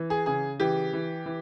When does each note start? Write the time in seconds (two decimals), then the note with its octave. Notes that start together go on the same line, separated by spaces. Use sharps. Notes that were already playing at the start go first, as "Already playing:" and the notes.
Already playing: E3
0.10 G#4
0.26 C#3 G#4
0.60 E3 G4
0.93 E3
1.26 E3